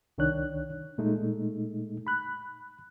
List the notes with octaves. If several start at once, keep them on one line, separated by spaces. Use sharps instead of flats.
C2 D#3 D4 C#5 F#6
A#2 G#3 A3 D#4
B5 F#6